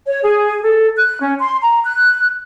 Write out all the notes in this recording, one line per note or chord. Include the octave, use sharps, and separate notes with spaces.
C#5
G#4
A4
F#6
C#4
C6
A#5
F#6